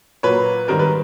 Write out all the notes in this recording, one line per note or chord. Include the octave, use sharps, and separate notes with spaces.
A#2 F#3 A#3 B4 C#5
G#2 D#3 G3 C4 A#4 C5
B4